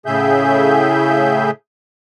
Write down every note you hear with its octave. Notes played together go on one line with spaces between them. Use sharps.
A2 C#3 G#4 E5 G6